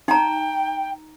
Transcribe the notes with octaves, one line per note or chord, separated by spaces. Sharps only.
D#4 G5 A#5